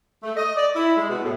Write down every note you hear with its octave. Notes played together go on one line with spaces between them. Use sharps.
A3
D#5
D5
E4
G#3
B2
A2